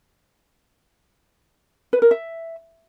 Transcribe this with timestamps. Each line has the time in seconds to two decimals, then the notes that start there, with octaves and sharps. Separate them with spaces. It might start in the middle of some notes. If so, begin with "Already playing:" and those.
1.93 B4
2.02 A#4
2.11 E5